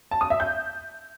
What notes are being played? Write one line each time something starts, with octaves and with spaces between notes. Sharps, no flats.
A5
D#6
E5
G6